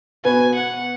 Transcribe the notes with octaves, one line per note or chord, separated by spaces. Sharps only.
B2 B3 F#4 B4 G#5
F#5